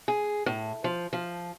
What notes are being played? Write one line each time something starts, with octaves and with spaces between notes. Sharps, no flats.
G#4
A2
F3
F3